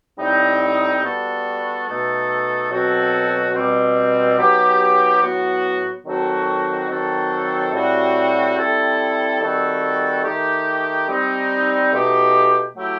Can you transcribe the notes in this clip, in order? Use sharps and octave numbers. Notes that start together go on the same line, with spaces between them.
A2 G3 C4 D#4
G3 B3 F#4 A4
B2 A3 D#4 A4
B2 F#3 C4 F#4 A4
B2 G3 C4
F#3 B3 D#4 G4
A2 F#3 B3 F#4
D#3 F#3 C4 F#4 A4
D#3 F#3 C4 F#4 A4
A2 G3 C4 F#4
G3 C4 E4 A4
D#3 G3 C4 F#4 A4
D#3 A3 D#4 G4
G3 C4 D#4
B2 A3 D#4 G4
F#3 A3 E4 G4